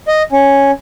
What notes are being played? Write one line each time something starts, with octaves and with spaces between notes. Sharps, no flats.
D#5
C#4